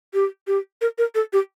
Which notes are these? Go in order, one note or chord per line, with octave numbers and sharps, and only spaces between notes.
G4
G4
A#4
A#4
A4
G4